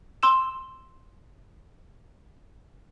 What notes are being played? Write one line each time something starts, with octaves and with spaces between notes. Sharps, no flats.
C6 E6 E7